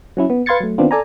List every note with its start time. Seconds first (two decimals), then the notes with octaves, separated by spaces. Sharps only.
0.17 F#3 C#4 E4
0.30 B3
0.46 B4 F5 C6 G#6 A6 C#7
0.60 F#3 A3
0.78 D#3 B3 C4 D4 F4
0.91 A4 D5 G#5 A#5